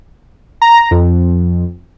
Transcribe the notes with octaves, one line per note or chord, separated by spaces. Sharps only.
A#5
F2